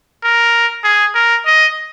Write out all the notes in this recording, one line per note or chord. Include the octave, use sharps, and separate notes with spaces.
A#4
G#4
A#4
D#5